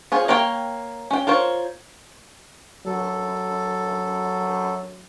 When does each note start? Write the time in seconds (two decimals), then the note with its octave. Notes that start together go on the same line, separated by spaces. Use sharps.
0.12 C4 F4 G#4 C#5
0.28 A#3 A#4 C#5 G5
1.11 C#4 G5
1.27 F4 A#4 C5 C#5
2.86 F#3 A4